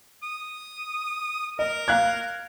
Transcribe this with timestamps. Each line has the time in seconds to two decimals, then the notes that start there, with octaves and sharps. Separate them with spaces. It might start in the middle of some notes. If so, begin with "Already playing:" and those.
0.23 D#6
1.59 A#4 D#5
1.88 F5 F#6 G#6